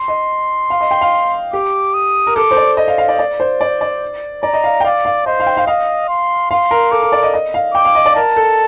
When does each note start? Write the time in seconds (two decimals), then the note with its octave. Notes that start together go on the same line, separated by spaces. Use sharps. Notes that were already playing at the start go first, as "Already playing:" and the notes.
Already playing: C6
0.08 D#5
0.70 F5
0.81 D#5
0.91 G5
1.01 F5
1.53 G4 D6
1.94 D#6
2.27 A#4
2.36 A4 D6
2.51 C5
2.57 D5
2.77 D#5
2.88 F5
2.98 F5
3.09 D5
3.19 D5
3.40 C5
3.61 D5
3.81 D5
4.43 D5 A#5
4.54 D#5
4.64 F5
4.80 G5
4.84 D5 F5
5.05 F5
5.26 C5 D#5
5.40 F5
5.47 G5
5.57 F5
5.67 D#5 F5
6.09 C6
6.51 F5 C6
6.71 A#4
6.92 A4 D6
7.02 A#4
7.12 D5
7.23 D#5
7.34 D#5
7.54 F5
7.75 G5 D6
7.85 F5
7.95 D#5
8.06 D5
8.16 A#4 A5
8.36 A4